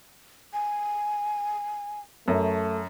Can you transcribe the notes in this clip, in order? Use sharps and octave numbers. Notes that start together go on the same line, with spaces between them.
G#5
F#2 A3